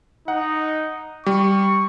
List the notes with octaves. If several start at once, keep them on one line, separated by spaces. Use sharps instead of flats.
D#4 F#5
G3 C#6